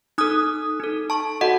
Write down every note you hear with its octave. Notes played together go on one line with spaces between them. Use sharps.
D#4 A4 D#6 F#6
D#4 A4
A5 C#6
F#4 A4 D#5 F#5